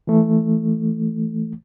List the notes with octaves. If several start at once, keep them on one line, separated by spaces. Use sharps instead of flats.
E3 A3